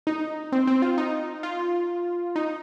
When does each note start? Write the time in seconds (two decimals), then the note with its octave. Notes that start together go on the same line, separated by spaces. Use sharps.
0.07 D#4
0.52 C4
0.67 C4
0.82 F4
0.98 D#4
1.43 F4
2.36 D#4